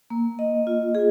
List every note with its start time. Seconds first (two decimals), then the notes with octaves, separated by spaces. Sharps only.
0.10 A#3
0.39 D#5
0.67 F4
0.95 G#4